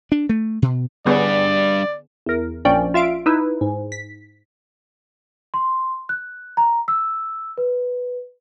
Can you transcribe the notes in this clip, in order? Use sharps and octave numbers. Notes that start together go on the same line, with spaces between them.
D4
A3
B2
D3 G3 B3 D4 G#4 D5
E2 A#4
A#1 F3 C#4 D5 G5
F4 E5 F5 D7
D#4 E4 B4
G#2
B6
C6
F#6
A#5
E6
B4